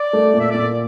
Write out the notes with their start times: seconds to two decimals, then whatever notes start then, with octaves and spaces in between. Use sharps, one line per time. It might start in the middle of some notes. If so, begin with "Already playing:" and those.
Already playing: D5
0.13 A3
0.34 A#2
0.39 E5
0.50 A#2 D5